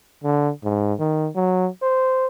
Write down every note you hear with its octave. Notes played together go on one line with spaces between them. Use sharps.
D3
G#2
D#3
F#3
C5